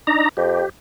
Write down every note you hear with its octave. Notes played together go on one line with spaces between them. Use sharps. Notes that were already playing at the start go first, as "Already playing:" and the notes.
D4 D#4 A#5
F2 G4